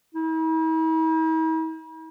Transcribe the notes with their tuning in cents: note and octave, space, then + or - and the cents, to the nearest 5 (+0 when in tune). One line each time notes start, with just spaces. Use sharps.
E4 -45